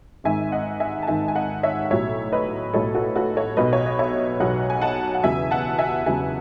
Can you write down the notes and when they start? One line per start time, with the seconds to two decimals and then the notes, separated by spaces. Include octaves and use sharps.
0.24 G#1 G#2 D#3 E5 G#5
0.52 D#5 F#5
0.80 E5 G#5
1.02 A5
1.07 G#1 G#2 D#3 E5 G#5
1.28 G#5
1.35 D#5 F#5
1.63 C#5 E5
1.85 F#5
1.90 B1 A2 F#3 C#5 E5
2.32 B4 D#5
2.74 B1 A2 F#3 A4 C#5
2.95 F#4 A4
3.16 F#4 A4
3.36 A4 C#5
3.57 B1 B2 F#3 B4 D#5
3.73 C#5
3.86 D#5
3.99 C#5 E5
4.40 B1 B2 F#3 D#5 F#5
4.70 G#5
4.82 F#5 A5
5.15 F#5
5.23 E2 C#3 F#3 E5 G#5
5.51 F#5 A5
5.78 E5 G#5
6.06 E2 C#3 F#3 E5 G#5